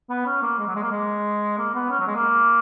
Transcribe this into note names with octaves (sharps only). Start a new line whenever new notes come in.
B3
C#4
A#3
G#3
F#3
G#3
A#3
G#3
A#3
B3
C#4
F#3
G#3
A#3